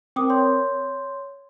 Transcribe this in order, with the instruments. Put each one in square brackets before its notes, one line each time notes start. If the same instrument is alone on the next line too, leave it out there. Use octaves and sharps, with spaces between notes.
[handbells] C4 A#4 [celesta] G5 D6 D#6
[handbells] C#5 G6 [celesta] C6